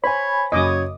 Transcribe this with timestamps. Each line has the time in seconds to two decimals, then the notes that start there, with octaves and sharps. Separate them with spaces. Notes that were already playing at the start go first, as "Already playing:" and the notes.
0.04 C5 C#5 G#5 B5
0.52 F#1 C#3 F#3 C#5 D#5 D6 D#6